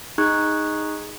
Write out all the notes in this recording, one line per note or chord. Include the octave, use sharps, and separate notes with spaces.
D#4 G#4 C#6 F#6 G#6